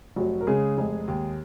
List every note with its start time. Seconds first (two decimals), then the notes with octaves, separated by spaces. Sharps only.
0.16 F1 F#3 F#4
0.41 A#4
0.47 C#3 G#3 G#4
0.78 F1
1.08 D#2